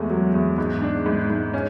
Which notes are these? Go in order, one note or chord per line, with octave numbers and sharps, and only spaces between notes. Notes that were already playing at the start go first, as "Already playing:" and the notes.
Already playing: E2 G#3 A3
F#3
E2
G#2
D4
G#2
G#2
C#4